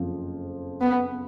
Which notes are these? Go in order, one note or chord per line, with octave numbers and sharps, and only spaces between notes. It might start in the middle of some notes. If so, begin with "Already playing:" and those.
Already playing: F#1 F2 F3
B3